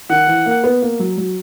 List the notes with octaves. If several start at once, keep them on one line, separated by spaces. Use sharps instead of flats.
D#3 F#5
E3
A#3
B3
A#3
F#3
F#3